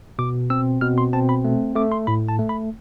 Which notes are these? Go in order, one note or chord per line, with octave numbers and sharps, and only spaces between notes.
B2 D6
C4 E6
B2 F6
C6
C4 A5
B5
A3
A3 D6
C6
A2 B5
A5
A3
B5